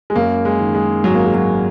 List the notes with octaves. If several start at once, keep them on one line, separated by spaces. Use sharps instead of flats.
G#3
F#2 A#3
G#3
D#3
G#3
G#1 F#3
A#3
G#3
F#3